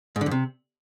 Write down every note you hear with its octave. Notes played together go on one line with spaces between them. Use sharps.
G#2
D3
F#2
C3